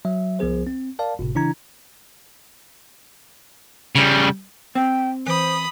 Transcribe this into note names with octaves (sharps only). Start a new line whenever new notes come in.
F#3 E5
C2 F3 B3 G#4 C5
C4
A#4 D5 F5 A5
G1 A2 C3
C#3 E3 D4 E4 A#5 G#6
C#3 G3
C4 G5
E3 C5 B5 D#6